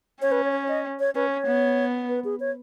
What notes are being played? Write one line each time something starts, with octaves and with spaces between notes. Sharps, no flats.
C#4 C#5
B4
C#5
C#5
D#5
C#5
C#4 B4
C#5
B3
B4
G#4
C#5